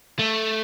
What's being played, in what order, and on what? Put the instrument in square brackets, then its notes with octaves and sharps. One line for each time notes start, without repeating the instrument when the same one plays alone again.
[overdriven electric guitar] A3